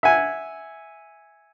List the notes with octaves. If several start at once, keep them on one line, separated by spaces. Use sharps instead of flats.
E5 F#5 G#5